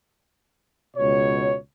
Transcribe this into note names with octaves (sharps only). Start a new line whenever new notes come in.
C#2 B2 C#5